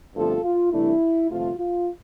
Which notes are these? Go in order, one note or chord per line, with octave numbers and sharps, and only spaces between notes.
G1 G2 F3 A3 C4 F4 A4
F4
C2 C3 E3 A3 D4 E4
G1 F2 C3 F3 A3 F4
F4